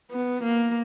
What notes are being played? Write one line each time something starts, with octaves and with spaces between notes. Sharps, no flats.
B3
A#3